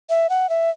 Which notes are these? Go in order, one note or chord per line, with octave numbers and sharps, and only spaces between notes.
E5
F#5
E5